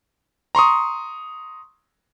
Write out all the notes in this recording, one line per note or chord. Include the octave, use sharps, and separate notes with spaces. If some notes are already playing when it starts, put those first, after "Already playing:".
A#5 C6 C#6 D#6